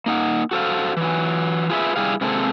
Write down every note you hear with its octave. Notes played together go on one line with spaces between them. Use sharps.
A#3 D#4 F#5
F#4 A4 C5 F5
E3 F#3
F4 G#4 B4 E5
G3 E4 G4 G#4 F5
C3 G#3 A#3 C4 A4